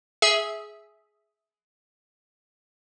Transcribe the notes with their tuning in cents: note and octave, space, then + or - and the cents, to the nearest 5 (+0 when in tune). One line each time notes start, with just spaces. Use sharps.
G#4 +10 E5 -5